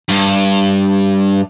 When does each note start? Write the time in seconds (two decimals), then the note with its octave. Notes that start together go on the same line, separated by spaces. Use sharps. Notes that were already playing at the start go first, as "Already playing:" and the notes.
0.09 G2